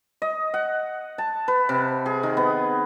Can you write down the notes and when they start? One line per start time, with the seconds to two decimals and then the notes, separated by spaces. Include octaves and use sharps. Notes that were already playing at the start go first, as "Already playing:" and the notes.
0.22 D#5
0.54 F#5
1.18 A5
1.48 B4
1.69 C3
2.06 G#4
2.23 D#3
2.37 B3